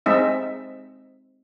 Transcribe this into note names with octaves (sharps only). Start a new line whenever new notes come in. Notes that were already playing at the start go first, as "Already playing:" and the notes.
G#3 C4 D#4 E5